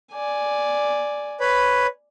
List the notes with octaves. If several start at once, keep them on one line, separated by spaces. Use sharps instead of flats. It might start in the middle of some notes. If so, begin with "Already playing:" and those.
D5 G#5
B4 C#5 B5